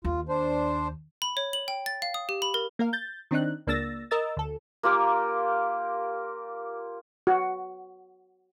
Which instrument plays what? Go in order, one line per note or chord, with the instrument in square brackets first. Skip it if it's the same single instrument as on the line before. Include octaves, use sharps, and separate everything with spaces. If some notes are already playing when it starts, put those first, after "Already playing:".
[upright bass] D#2 [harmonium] F4
[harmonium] D4 C5
[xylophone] B5
C#5
F#7
G5
A6
F5
D#6
G4
B5
A#4
[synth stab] A#3 A#4 F5
G6 A6
D#3 C4 D4 D#4 F#6
C#2 A#3 D4 E6 A6 A#6
A#4 D#5 E6 A6
D2 A4
[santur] A#3 F4 G4 A#4
[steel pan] F#4